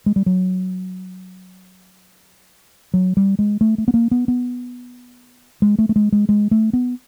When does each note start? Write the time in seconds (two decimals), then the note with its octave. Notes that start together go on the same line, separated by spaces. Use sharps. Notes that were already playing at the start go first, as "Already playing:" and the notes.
0.06 G#3
0.16 G3
0.26 F#3
2.94 F#3
3.17 G3
3.39 G#3
3.61 A3
3.78 A3
3.88 B3
3.94 A#3
4.11 B3
4.28 B3
5.62 G#3
5.79 A3
5.89 A3
5.96 G#3
6.12 G#3
6.29 G#3
6.51 A3
6.73 B3